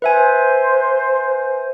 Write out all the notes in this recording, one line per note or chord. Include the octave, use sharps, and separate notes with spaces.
B4 C5 E5 G#5